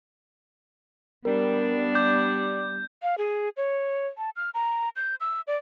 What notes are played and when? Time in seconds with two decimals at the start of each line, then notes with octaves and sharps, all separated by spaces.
1.25 G3 B3 D4 A#4
1.95 D6 G6
3.03 F5
3.18 G#4
3.57 C#5
4.18 A5
4.36 F6
4.54 A#5
4.96 G6
5.21 E6
5.47 D5